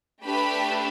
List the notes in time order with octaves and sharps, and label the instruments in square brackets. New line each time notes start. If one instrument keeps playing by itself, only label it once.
[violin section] A3 D4 G4 B4 B5